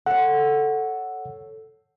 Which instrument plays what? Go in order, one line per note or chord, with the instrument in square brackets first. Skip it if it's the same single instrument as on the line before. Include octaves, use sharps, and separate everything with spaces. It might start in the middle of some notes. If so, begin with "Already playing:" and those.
[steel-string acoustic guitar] A4 C#5 [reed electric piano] F#5